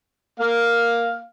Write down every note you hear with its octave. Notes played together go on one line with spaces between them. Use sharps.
A#3 F5